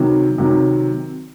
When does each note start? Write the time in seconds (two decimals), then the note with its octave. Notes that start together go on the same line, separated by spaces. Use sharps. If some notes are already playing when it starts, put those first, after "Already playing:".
Already playing: C3 D#3 F#3
0.38 C3 D#3 F#3